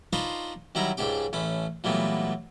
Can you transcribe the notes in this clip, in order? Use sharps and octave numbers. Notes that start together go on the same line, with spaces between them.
D4 D#4 F4 B4 C5 C#6
D#3 F#3 G3 E4 A#5
C#2 G#2 D4 G4 G5
A1 A3 C#4 B5
A#2 E3 F#3 G3 A3 B3